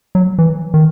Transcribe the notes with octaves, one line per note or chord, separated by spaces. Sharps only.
F#3
E3
D#3